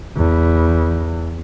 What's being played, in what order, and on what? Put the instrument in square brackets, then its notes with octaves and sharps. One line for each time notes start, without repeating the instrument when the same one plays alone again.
[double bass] E2